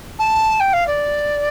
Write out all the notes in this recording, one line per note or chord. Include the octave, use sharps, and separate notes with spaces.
A5
G5
F5
D5